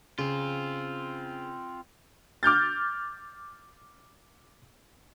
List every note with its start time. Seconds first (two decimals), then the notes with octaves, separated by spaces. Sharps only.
0.19 C#3 C4 F4
2.43 D6 F6 G6 A6